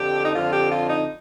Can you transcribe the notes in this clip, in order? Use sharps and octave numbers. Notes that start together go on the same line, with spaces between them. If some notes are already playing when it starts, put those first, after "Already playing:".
Already playing: F2 D3 F3 G4
D#4
F2 D3 F3 F4
G4
F4
D#4